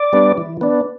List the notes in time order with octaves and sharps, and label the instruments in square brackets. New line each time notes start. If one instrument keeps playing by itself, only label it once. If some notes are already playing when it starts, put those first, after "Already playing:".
Already playing: [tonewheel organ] D5
G3 B3 D4
E3
B3 D4